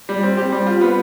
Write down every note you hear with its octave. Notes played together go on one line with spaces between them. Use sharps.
G3
C4
G4
G3
F4
B3